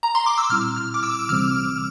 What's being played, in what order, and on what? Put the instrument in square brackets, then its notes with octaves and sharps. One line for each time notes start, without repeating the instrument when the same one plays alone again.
[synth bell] A#5
C6
D6
E6
[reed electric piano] A#2 G3 C4 E4 [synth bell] F6
[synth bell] F6
D6
E6
[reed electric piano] C2 C3 E3 G3 C4 [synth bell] F6